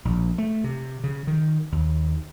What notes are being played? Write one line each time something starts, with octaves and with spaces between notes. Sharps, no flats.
A#1
A3
C3
C#3
D#3
D#2